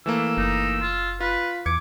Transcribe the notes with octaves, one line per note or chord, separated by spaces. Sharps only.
E3 A3 A#3 E6
F#1 D#4
F4
F4 B4
E2 D6 G#6 C#7